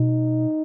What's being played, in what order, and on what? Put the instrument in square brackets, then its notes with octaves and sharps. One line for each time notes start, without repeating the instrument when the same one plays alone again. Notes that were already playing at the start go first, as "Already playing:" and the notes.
Already playing: [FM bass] B2 [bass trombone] D#4